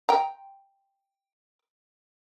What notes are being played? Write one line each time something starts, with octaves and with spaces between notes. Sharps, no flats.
G5 A#5